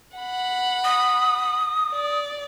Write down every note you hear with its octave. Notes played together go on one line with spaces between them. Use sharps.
F#5 B5
D#6
D5